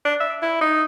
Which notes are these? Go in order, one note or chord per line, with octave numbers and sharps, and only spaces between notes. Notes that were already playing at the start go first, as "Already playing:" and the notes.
D4
E5
E4
D#4